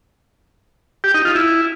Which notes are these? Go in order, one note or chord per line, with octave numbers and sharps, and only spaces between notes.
G4
D#4
F4
E4